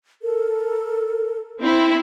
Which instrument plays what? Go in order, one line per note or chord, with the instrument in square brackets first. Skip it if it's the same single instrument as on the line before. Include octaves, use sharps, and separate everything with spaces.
[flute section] A4 A#4
[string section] C4 E4